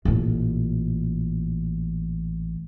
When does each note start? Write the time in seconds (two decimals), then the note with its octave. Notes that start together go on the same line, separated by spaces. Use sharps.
0.05 A1 A#2